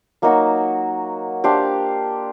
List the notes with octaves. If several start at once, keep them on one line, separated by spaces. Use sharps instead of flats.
F#3 A#3 D#4 F#4
D4 G4 C5 F5